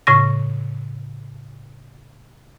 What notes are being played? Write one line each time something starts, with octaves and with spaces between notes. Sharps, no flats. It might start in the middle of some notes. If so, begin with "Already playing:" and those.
A2 C#3 C#6 A#6